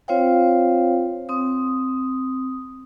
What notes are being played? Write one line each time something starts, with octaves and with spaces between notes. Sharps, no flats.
C4 F4 C5 C#5 F5 G5
C4 D#6